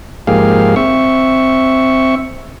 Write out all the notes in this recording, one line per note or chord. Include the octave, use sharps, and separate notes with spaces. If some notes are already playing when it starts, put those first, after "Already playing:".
G#2 F3 A#3 G4 G#4 F5
C4 E5 C#6